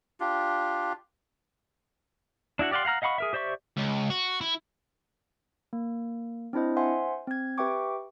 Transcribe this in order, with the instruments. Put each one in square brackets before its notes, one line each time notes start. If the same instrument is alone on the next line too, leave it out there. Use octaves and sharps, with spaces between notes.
[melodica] D4 F4 G4
[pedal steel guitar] D4 E4 F#4 F#5
G4 D5 F5 F#5 C6
F5 F#5 A#5 F6
D#5 F5 F#5 B5 C#6
G#4 A#4 E5
G4 C5 D5 E5 C#6
[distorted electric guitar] C#2
F#4
E4
[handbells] A#3
C4 D4 E4 C5 D#5
C5 E5 F#5 G#5 C6
C4 G#6
G4 B4 E5 G5 C#6 D6